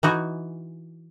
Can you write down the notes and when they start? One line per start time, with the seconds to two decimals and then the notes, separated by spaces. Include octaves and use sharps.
0.03 E3 D#4 F#4 G#5